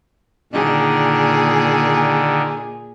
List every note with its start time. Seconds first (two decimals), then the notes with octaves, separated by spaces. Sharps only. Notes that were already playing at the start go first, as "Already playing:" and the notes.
0.53 A#2 D3 D#3 G#4